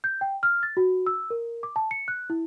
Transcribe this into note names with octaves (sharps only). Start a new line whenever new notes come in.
G6
G5
F6
A6
F#4
E6
A#4
D6
A5
C#7
F#6
E4